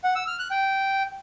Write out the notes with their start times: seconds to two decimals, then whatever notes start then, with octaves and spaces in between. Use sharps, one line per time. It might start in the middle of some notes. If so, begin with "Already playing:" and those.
0.04 F#5
0.16 E6
0.27 F6
0.39 F#6
0.51 G5